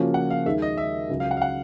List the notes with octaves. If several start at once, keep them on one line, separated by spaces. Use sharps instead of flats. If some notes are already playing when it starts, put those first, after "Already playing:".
Already playing: C#3 F3 A#3 C#4 F#4
F#5
F5
D#2 D#3 G#3 E5
D#5
E5
C#2 C#3 F#3
F5
F#5
F5
F#5